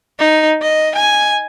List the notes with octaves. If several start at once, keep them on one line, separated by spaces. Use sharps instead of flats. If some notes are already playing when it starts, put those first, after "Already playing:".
D#4
D#5
G#5